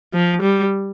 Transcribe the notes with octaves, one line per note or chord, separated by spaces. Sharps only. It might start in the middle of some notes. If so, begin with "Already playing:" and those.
F3
G3